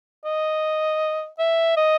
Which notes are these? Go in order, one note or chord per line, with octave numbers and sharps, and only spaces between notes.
D#5
E5
D#5